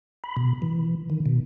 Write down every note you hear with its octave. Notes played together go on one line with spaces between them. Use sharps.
B5
B2
E3
D#3
B2